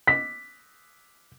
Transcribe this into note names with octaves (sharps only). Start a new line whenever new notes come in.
B6